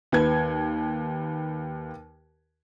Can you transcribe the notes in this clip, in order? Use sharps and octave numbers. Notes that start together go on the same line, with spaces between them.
D#2 B4 G#6